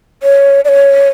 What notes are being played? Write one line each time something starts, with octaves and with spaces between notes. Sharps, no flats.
C#5
D5
C#5